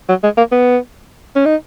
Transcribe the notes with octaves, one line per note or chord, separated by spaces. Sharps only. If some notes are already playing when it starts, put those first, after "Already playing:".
F#3
G#3
A#3
B3
C#4
D#4